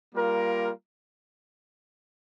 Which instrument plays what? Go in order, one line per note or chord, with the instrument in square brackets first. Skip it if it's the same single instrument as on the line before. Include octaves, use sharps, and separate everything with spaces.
[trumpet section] G3 A#3 F4 A#4